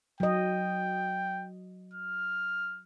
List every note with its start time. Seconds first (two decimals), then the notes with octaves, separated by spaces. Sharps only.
0.20 F#3 D#5 G5
1.93 F6